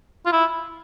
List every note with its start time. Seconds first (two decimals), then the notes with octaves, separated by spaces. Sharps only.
0.26 F4
0.32 E4